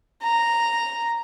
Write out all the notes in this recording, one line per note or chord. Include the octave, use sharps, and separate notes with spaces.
A#5